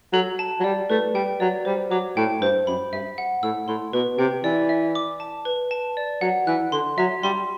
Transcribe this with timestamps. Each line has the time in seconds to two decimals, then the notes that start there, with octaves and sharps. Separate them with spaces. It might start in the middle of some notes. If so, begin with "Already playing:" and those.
0.13 F#3 A4
0.39 A5
0.60 F#3
0.64 G3 D5
0.90 A3 B4
1.14 G3 G5
1.40 F#3 D5
1.65 G3 C5
1.91 F#3 D6
2.17 A2 G5
2.41 G2 C5
2.67 F#2 B5
2.93 G2 E5
3.18 F#5
3.43 A2 E6
3.68 A2 C6
3.93 B2 B4
4.19 C3 G5
4.44 E3 D5
4.69 E5
4.95 D6
5.20 A5
5.45 B4
5.71 A5
5.97 D5
6.21 F#3 F#5
6.47 E3 F#6
6.72 D3 C6
6.98 F#3 E5
7.23 G3 C6